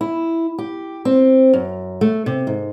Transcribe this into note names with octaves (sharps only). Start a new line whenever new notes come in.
E4
G4
C4
F#2
A3
C3
G#2